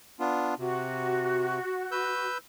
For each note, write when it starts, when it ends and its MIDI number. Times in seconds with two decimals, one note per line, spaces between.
0.20 0.55 59
0.20 0.55 62
0.20 0.55 65
0.59 1.59 48
0.59 2.28 66
1.92 2.38 71
1.92 2.38 88
1.92 2.38 91